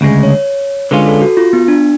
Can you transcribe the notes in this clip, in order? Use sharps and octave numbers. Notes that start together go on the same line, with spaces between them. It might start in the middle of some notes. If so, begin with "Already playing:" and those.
D2 C#3 G#3
C#5
D3 G#3 C#4 F4 B4
A4
F#4
F4
B3
D4